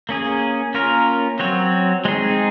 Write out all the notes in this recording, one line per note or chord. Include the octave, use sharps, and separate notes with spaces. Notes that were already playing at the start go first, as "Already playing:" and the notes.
A#3 C#4 G#4
A#3 C#4 F4 A#4
F#3 C4 F#4 C#5
G#3 C4 D#4 G#4